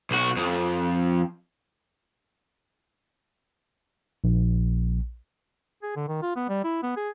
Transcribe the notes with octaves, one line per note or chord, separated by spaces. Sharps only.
B1 F#4
F2
A#1
G#4
D3
D#3
F4
B3
G3
E4
B3
G#4